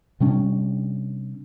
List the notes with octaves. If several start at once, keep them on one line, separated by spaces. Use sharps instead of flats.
C3 G3 C#4 D4